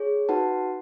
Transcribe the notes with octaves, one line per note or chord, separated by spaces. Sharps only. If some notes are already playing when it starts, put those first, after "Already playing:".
Already playing: G#4 C#5
D#4 F#4 B4 F#5 A5